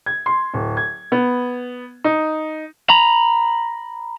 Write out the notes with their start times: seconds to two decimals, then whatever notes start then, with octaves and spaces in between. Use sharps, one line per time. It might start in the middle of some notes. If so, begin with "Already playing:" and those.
0.06 G#6
0.26 C6
0.54 D1
0.77 G#6
1.12 B3
2.04 D#4
2.90 A#5 B5